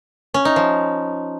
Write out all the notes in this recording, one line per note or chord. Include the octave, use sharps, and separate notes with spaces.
C#4
D#4
F3